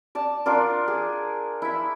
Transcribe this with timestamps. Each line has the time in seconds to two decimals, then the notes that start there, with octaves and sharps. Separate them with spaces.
0.15 D5 A5
0.46 D4 F4 A#4 D5
0.88 G#4
1.62 E4 E5